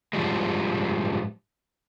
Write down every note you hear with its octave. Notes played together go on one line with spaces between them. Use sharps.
G#2 F3 G3 G#3